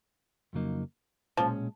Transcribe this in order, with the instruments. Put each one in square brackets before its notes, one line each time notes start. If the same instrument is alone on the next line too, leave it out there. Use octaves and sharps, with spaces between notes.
[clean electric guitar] F2 C#3 F#3 A#3 D#4
[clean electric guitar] B1 A#2 G#3 C#4 [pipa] F3